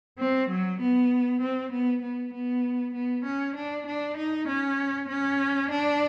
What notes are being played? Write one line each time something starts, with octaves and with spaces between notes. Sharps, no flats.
C4
F#3
B3
C4
B3
B3
B3
B3
C#4
D4
D4
D#4
C#4
C#4
D4